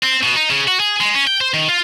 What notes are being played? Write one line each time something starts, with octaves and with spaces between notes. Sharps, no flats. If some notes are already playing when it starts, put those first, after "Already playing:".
C4
B2
D#4
C#3
F#4
G#4
G#3
C#4
G5
C5
D#3
F4